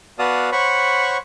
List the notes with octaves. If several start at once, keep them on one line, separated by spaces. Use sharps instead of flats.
B3 F#4 D5 F5 A5 D#6
C5 C#5 F#5 B5 C#6